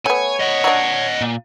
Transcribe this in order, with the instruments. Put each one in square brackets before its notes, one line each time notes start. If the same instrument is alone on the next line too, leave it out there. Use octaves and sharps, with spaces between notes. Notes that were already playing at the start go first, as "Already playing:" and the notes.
[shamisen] A3 B3 [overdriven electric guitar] C#5 [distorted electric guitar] G#5
[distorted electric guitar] D#5 F#5
[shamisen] F#3 D4
[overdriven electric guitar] A#2